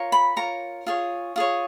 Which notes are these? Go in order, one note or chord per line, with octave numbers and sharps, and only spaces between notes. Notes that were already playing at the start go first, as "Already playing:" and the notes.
Already playing: F4 A#4 C#5
B5
F4 A#4 C#5 A#5
F4 G#4 C#5
F4 G#4 C#5